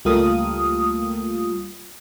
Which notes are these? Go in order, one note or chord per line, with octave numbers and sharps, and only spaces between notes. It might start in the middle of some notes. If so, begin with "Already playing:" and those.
C#2 G3 A3 A#3 F4 D#6